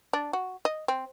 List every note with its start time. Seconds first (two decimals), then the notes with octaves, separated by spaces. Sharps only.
0.13 D4
0.33 F#4
0.65 D#5
0.88 C4